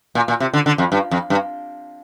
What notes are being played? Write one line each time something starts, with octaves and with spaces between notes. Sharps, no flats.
A#2
A#2
C3
D3
D3
F2
G2
F2
G2